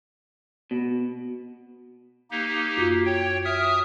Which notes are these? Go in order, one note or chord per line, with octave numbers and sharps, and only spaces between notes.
B2
A#3 D#4 G4
F#2 F4 F#4
C#5 G5
E5 D#6 F6